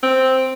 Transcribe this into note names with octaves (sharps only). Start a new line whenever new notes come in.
C4